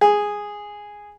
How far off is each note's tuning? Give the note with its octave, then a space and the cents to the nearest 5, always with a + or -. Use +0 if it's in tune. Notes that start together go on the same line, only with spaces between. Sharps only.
G#4 -5